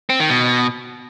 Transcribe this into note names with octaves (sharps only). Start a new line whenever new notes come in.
C4
D#3
B2